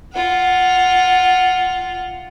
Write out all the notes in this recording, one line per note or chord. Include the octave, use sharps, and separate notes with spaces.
F4 F#5